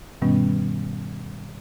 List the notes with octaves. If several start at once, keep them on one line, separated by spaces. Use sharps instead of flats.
G2 B2 D#3 G3 B3 C#4